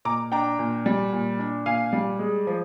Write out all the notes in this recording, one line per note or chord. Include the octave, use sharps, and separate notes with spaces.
A#2 A#5 D6
D4 G5 A#5
A#2
G3
A#2
D4
A#2 F5 G#5
G3
G#3
F3